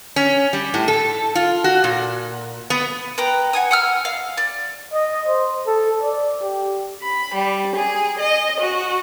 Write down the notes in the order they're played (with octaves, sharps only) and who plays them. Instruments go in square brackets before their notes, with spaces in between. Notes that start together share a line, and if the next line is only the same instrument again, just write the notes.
[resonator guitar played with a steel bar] C#4
G3
A2
A4
F4
F#4
A#2
B3
[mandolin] B4 G5 A#5
F#5 G#5 D#6
F#5 E6 F6
F5
D5
[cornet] D#5
C5
A4
D5
G4
[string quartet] B5
G3
G#4
D#5
F#4